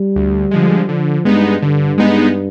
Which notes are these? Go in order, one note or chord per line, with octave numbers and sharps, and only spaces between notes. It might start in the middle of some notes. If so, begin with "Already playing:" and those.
Already playing: G3
D2
D3 F3 G#3
D3 F3
G2 G#3 B3 D#4
G2 D3
G#3 B3 D#4